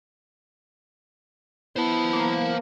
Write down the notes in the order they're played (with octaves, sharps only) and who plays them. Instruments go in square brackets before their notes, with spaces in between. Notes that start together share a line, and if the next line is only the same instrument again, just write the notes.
[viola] B3 [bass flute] E4 [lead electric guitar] C5 A5
[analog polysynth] A#3